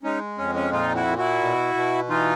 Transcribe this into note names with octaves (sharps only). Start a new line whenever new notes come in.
G#3 C#4 D#4
F2 C#4
C#4
A#2 D#4 F4
E4 F#4
A#2
E4 F#4
B2
B2
E3 D#4 F4